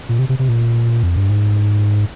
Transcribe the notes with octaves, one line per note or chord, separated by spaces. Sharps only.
A#2
C3
C3
C3
A#2
F2
G2
G#2